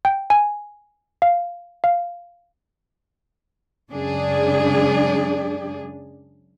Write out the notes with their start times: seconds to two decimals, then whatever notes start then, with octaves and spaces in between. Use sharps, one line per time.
0.05 G5
0.30 G#5
1.22 F5
1.84 F5
3.91 F#2 C#3 G#3 D4 G#4 D5